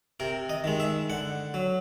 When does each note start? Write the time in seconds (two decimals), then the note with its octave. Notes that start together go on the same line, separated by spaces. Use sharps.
0.20 C3 A#4
0.49 D#5
0.64 D#3 G#3
0.80 E5
1.10 D3 F#5
1.54 F#3